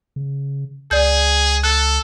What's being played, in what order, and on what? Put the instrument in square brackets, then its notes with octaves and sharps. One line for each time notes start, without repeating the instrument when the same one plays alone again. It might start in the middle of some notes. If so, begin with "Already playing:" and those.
[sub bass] C#3
[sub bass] C#2 [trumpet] G#4 [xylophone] D5 G6
[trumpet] A4 [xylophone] F#6